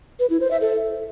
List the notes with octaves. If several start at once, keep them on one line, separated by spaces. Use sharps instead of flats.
B4
E4
C5
E5
A4